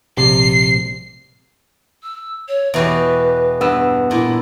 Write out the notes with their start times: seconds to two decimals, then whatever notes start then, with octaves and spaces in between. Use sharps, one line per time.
0.17 A#1 C3 C7
2.03 E6
2.48 C#5
2.74 E2 B2 G4 B4
3.61 G2 B3 E6
4.11 A#2 E4